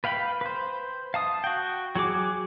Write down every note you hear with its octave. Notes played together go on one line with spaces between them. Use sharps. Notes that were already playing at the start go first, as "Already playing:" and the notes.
B4 F5 G5 B5
B4 C5
F5 A5 D#6
F#4 G5
F#3 F#4 G#4 D6